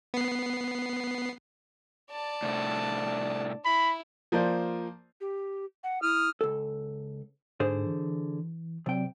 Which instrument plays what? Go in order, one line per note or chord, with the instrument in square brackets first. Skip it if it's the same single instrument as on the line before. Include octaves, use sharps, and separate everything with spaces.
[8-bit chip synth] B3 C7
[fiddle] D5 A5
[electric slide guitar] A2 C3 A3 [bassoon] D4
[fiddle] E4 [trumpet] B5
[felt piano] F3 A#3 C5 D5
[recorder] G4
F#5
[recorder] E4 [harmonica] D#6 F6
[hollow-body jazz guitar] C#2 A4
[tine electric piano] G#2 [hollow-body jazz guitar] D3 G#4 C5
[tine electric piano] E3
[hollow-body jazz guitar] C3 G5 [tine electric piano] F#3 C4 D5